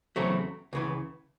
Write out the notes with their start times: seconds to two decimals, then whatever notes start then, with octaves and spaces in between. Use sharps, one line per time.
0.16 E2 C#3 F#3 A3 C4
0.73 C#2 C#3 E3